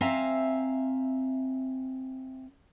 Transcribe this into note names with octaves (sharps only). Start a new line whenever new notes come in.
C4 E5 F5 G#5 A#5